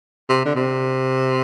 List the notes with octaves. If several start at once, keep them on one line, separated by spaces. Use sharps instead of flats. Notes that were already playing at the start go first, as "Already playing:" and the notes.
C3
D3
C3